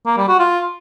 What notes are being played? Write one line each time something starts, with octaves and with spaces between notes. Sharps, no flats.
A#3
G3
F#4
F4